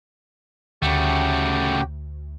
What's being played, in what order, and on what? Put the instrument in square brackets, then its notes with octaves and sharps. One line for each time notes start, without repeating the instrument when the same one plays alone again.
[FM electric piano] D2 [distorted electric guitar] C#3 A3 [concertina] F#4 G4 G5